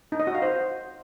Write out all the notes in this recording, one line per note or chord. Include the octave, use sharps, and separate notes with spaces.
D#4
D#5
F#4
F5
C5